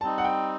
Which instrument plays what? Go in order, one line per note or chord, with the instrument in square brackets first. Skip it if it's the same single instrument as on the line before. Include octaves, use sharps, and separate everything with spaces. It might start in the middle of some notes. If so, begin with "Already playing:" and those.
[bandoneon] G3 C4 D#4 [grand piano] A5
[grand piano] F#5
G5